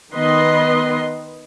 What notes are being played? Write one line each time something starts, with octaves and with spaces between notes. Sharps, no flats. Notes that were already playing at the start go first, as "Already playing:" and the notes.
D#3 B3 B4 D#5 C6